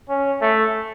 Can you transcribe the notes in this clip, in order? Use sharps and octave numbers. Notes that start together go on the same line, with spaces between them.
C#4
A3